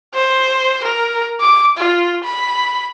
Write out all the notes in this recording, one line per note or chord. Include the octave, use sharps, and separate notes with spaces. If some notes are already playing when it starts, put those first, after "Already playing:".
C5
A#4
D6
F4
B5